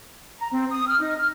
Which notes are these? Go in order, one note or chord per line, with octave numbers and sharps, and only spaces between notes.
A#5
C4
D#6
F6
D#4
F6